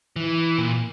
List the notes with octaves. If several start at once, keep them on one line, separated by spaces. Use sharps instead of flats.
E3
A#2